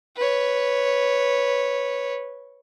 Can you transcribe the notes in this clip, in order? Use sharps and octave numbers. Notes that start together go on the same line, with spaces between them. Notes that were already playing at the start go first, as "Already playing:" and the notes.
B4 C#5